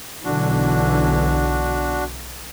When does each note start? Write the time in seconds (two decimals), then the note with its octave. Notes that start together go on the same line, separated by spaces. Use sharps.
0.24 B1 D3 E3 D4 F#4